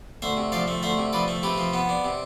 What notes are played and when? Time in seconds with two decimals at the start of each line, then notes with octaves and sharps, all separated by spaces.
0.22 D2 C5 E5
0.37 C3
0.52 F3 D5 F5
0.68 A3
0.83 D2 C5 E5
0.98 C3
1.13 F3 B4 D5
1.28 A3
1.43 C3 G4 B4
1.58 F3
1.73 B3
1.89 D4
2.04 C3